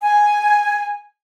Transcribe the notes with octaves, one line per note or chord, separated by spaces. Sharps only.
G#5